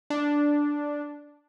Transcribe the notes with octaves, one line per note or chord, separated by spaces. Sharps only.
D4